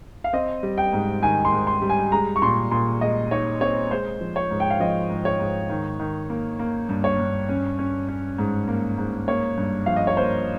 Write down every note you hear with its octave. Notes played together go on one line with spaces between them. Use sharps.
F5
C4 D#5
G3
G5
G#2
D#3 G#5
C6
G#2
C6
G3
G#5
G#3 A#5
C#6
A#2 C6
A#2 C6
G#3 D#5
D#4 C#5
C4 C#5
G#3 C5
F3
C#5
G#2
G5
F5
F3 D#5
G#2
C#5
G#2
D#3
D#3
A#3
A#3
G2
C#5
G2
C#4
C#4
C#4
G#2
A#3
G#2
A#3 C#5
G2
F3 F5
D#5
C#5
A#3 C5